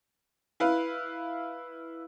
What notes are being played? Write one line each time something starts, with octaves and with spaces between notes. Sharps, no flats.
E4 B4 F5